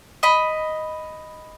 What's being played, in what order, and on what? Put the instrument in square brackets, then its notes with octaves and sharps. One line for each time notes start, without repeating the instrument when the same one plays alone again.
[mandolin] D#5 B5